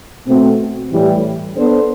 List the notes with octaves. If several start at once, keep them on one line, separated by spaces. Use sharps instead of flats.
B2 A3 C4 F#4
A2 E3 G3
B3 D4 A4 C5